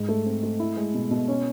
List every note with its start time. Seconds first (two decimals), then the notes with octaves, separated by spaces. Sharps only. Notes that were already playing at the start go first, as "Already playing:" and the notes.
Already playing: G#2
0.09 A3
0.26 C4
0.44 A3
0.60 E4
0.77 G#3
0.94 B2
1.11 B2
1.28 C#4